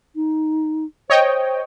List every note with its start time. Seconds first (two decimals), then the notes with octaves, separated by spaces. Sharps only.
0.16 D#4
1.10 C5 C#5 D#5 G5